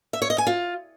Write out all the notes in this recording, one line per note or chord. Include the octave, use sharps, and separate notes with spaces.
E5
C#5
D#5
G#5
F4